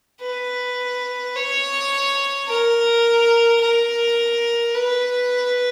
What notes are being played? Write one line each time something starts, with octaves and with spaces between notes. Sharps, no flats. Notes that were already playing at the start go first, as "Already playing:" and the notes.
B4
C#5
A#4
A#4
B4